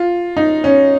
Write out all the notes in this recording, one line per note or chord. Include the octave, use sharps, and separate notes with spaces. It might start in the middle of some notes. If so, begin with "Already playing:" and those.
Already playing: F4
D#4
C#4